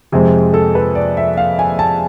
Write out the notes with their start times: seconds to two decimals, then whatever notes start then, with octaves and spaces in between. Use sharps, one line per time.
0.12 F2 C3 G#3 C4 G#4
0.54 A4
0.75 B4
0.95 D5
1.17 E5
1.37 F5
1.59 G#5
1.79 A5